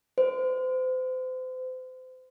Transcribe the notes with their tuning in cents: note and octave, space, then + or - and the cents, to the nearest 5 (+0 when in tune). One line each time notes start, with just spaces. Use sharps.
C5 -35